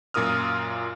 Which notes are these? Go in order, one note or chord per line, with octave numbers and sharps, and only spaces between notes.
F#2 A#2 F4 A#4 D#6 F6